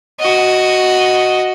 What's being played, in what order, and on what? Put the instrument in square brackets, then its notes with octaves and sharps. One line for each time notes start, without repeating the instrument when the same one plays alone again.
[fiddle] F#4 D#5